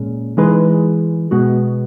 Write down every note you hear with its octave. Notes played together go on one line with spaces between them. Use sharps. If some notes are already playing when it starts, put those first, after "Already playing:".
Already playing: A#2 G#3 C#4
E3 G#3 D#4 G#4 B4
B2 G#3 B3 F#4